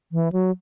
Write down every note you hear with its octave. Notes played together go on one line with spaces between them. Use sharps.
E3
F#3